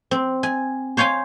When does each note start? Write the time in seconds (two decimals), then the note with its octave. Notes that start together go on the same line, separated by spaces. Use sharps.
0.11 C4
0.43 G#5
0.97 C5 C#5 F5 G5 G#5